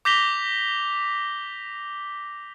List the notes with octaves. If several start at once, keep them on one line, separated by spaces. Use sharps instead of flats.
D6 G6 A#6 B6 F7 G7